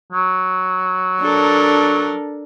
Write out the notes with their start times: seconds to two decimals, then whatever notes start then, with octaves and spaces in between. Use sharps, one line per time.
0.12 F#3
1.21 D4 A4 A#4